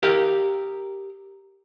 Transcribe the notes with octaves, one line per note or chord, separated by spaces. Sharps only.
G4 A#4 F5